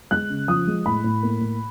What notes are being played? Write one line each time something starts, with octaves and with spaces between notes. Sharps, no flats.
G#3 F#6
C#3
F3 D#6
G#3
A2 B5
A2
A#3
A2